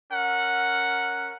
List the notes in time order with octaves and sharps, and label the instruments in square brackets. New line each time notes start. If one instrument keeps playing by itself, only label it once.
[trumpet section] C#4 A#4 F#5